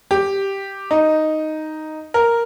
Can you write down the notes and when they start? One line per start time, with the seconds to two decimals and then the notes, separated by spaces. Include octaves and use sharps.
0.11 G4
0.91 D#4
2.14 A#4